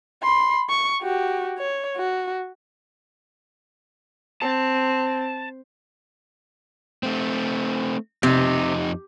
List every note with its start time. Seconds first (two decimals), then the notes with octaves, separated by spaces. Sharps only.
0.23 B5 C6
0.69 C#6
1.02 F#4 G4
1.58 C#5
1.96 F#4
4.42 C4 A5
7.03 A3 C4
8.23 F2 C3 D#4